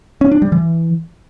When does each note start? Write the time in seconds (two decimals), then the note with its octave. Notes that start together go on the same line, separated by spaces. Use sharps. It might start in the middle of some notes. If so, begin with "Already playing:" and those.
0.21 C#4
0.32 D4
0.42 G3
0.52 E3